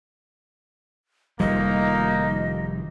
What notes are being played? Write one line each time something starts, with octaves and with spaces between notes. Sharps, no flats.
F1 D#3 F3 G3 A#3 D#4 D#5